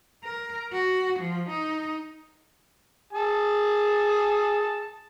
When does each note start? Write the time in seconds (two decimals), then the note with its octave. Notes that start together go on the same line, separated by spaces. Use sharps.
0.24 A#4
0.72 F#4
1.19 F3
1.49 D#4
3.13 G#4 A5